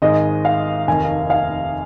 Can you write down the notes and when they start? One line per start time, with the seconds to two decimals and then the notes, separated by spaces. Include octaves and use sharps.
0.02 G#1 G#2 D#3 G#3 D#5
0.45 F5
0.87 F1 D#2 D#3 G#5
1.30 F5